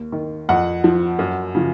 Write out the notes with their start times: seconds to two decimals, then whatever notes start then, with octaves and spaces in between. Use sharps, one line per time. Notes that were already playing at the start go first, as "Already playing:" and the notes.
Already playing: D#2
0.12 D#3
0.49 F2 F#5
0.84 F3
1.19 F#2
1.55 C#3 F3